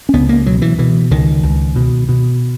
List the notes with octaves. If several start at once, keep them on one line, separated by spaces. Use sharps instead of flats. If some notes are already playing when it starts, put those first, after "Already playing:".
C#4
C#2 B3
A#3
B2 F#3
E3
B2 E3
C#2 D#3
C#2
B2
B2